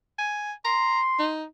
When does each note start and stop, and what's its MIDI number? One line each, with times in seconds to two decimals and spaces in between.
0.18 0.52 80
0.65 1.00 82
0.65 1.26 84
1.19 1.44 63